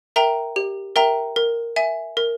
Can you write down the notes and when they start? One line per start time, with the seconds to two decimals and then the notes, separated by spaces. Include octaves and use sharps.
0.16 A#4 E5 G5 A#5
0.56 G4
0.96 A#4 E5 G5 A#5
1.36 A#4
1.76 E5 G#5
2.17 A#4